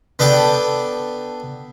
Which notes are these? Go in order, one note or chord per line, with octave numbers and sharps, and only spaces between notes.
B3 D4 A4 G5